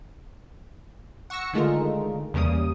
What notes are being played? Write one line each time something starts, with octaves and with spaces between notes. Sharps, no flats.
F#5 C#6 E6 A#6 C#7
D3 D#3 G#3 A3 F4 A#4
E2 C#3 G3 A#3 D#6